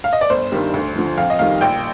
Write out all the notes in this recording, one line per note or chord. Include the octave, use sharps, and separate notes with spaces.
F5
D#5
D5
G1 C5
G2 D#3 G3
D2
D3 F3
F2 F5
D#5
D#3 G3 F5
A#1 G5